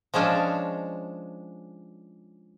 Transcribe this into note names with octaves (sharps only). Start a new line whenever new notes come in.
F3 G#3 C#4 D4